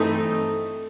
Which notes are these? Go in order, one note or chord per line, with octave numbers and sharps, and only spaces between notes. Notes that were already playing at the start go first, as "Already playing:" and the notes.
Already playing: G2 E3 A3 C4 D#4